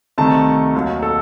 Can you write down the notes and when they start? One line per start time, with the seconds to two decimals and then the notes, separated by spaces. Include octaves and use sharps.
0.18 C2 C3 D#3 A3 A5
0.75 D#2 D#3 F#3
1.03 A4